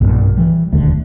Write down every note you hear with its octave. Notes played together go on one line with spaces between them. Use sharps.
B1 G2 A#2
E3 G3
E1 D#2 D3 A3